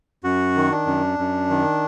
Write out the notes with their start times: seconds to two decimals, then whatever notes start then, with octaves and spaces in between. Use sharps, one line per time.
0.24 F#2 F#4
0.57 D#3
0.71 D4
0.87 F#2
1.19 F#2
1.50 D#3